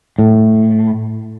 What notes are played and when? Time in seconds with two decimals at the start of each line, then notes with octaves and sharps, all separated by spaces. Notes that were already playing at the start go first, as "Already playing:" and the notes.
0.19 A2